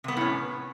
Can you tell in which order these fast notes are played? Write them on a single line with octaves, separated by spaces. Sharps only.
C3 B3 A3 A2 C#4